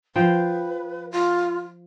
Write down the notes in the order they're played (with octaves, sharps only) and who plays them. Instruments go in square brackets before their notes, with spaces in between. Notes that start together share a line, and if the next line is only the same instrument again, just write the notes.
[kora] F3 C5 G5 [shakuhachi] B4
[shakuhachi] F4